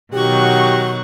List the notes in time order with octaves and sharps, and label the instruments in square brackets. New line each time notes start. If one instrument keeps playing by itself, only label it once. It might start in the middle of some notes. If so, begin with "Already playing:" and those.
[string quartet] B2 D#3 F#3 [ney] F#4 [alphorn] G4 [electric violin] F#5 C#6